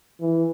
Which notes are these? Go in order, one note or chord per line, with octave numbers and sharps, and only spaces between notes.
E3